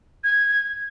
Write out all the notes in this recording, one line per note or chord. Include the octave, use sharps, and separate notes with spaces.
G#6